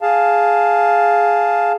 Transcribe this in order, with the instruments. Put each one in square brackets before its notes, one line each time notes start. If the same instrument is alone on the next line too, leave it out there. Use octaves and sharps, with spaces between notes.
[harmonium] G#4 F5 A5